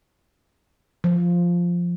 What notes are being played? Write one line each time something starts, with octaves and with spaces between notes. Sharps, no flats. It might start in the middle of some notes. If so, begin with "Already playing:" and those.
F3